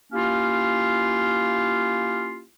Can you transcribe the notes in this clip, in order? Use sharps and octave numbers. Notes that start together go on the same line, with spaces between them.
A#3 C#4 E4 F4 G4